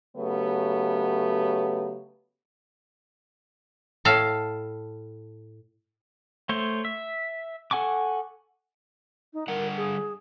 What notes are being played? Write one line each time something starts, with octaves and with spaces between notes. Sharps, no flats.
C#3 F#3 A3 B3 G4
A2 A4 F5
A3 C5 C#5
E5
A4 F#5 G#5 C#6 D6
D#4
D3 G3 A#4 F#5
G#4